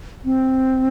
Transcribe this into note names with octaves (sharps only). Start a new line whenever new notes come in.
C4